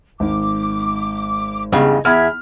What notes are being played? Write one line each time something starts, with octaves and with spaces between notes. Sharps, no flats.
G#1 D6
E2 G2 C#3 D#5
E2 E5 B5 F6 G#6